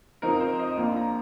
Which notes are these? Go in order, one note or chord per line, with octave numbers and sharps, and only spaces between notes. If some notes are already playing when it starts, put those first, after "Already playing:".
F2 F3 C4 D#4 A#4
C5
D#5
A#1 A#2 A#3
A#5